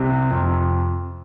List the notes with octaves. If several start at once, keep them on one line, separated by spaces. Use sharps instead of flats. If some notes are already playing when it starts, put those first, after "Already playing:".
Already playing: C2 C3
F2